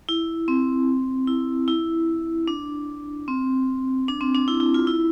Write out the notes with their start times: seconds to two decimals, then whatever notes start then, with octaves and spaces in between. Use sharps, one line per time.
0.09 E4
0.48 C4
1.27 E4
1.68 E4
2.48 D4
3.28 C4
4.08 D4
4.21 C4
4.34 D4
4.48 E4
4.60 E4
4.74 F4
4.87 E4